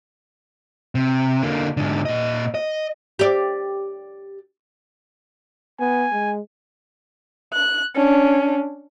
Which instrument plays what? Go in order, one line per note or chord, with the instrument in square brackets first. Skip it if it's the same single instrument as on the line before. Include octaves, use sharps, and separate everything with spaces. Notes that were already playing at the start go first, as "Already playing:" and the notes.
[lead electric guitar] C3
D3 A#3
G#2 D3
A#2 D#5
D#5
[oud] G4 D5
[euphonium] B3 [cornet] G#5
[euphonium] G#3
[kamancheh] F#6
C#4 D4